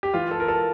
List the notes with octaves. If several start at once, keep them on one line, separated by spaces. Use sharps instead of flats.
G4
E3 F4
A4
A#4
A4